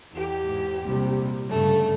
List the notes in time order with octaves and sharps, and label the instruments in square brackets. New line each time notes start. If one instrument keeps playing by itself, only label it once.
[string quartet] E2 G4
[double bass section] G#2
A#1 C3 G3
[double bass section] G1 C#3 [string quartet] G2 A3 A4